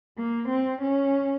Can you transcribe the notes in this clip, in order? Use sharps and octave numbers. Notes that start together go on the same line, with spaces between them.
A#3
C4
C#4